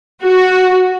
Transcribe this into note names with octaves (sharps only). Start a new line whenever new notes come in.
F#4